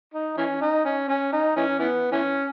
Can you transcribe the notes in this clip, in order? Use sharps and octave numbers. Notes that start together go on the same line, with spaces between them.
D#4
E3 C#4
D#4
C#4
C#4
D#4
E3 C#4
E3 B3
E3 C#4